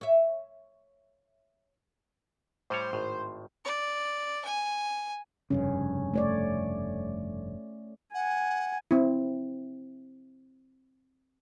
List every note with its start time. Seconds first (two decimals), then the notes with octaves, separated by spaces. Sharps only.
0.01 C#5 E5
2.70 A2 G3 C5 C#5
2.93 G#1 A2
3.65 D5
4.45 G#5
5.50 F1 G2 C#3 C#4
6.14 A3 C#5 D5
8.14 F#5 G#5
8.91 C4 E4